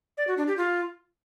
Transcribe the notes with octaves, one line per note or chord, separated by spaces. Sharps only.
D5
F#4
D4
G4
F4